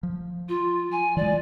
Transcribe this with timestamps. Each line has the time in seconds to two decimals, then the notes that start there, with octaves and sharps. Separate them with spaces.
0.03 F3
0.49 F4
0.92 G#5
1.17 E3 G#3 D5